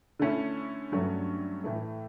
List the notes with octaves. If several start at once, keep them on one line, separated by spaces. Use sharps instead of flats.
D3 A3 C#4 E4
G2 F#3 A3 C#4
A2 E3 A3